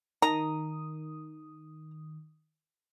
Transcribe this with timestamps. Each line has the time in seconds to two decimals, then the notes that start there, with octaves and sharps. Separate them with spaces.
0.22 D#3 A#5 D#6